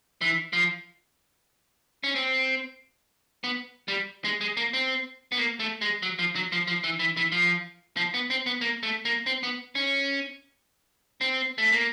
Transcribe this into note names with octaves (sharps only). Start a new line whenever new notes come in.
E3
F3
C#4
C4
B3
G3
G#3
G#3
A#3
C4
B3
A#3
A3
G#3
F#3
F3
F#3
F3
F3
E3
E3
E3
F3
F3
B3
C4
B3
A#3
A3
A#3
C4
B3
C#4
C4
A3
A#3